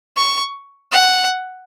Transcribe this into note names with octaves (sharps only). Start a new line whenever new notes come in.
C#6
F#5